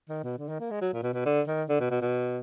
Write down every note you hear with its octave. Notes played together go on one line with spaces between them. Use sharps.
D#3
B2
D3
D#3
A#3
G#3
F#3
A#2
B2
B2
D3
D#3
D3
B2
B2
B2